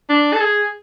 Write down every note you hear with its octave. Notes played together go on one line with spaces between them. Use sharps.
D4
A4
G#4